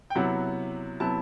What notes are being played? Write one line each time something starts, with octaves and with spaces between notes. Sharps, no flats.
G5
C3 F#3 B3 E4 F#5
C3 F#3 B3 E4 A5